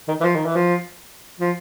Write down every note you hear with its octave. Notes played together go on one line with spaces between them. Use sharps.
D#3
E3
F3
D#3
E3
F3
F3